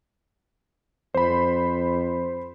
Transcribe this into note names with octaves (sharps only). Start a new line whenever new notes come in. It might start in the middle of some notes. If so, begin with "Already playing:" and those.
F2 C5 B5